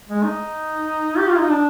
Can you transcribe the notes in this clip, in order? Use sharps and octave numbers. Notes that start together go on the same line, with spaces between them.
G#3
D#4
G4
F4
D#4
D4